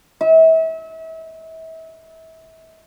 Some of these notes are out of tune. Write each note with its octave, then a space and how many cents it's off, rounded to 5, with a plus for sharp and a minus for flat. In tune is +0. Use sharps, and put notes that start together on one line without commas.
E5 -35